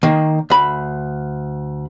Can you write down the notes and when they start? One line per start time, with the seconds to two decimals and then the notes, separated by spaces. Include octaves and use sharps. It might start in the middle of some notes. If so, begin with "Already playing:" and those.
0.03 D#3 A#3
0.50 D2 B5